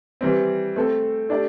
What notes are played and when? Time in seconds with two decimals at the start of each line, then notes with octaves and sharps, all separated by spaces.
0.21 E3 G3 C4
0.76 A3 C4 A4
1.29 A3 D4 G4 D5